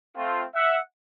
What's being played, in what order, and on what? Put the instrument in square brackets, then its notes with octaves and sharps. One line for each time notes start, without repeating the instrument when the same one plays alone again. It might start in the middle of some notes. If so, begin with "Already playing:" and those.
[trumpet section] A3 C4 F4
E5 F#5